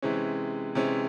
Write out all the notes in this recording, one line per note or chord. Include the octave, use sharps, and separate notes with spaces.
C3 E3 G#3 C#4
C3 E3 G#3 C#4